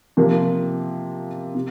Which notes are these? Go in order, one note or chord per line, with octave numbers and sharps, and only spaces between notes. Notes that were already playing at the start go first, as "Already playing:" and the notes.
C3 F3 A#3 F4
C3